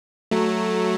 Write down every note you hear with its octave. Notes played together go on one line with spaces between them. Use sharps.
F#3 A3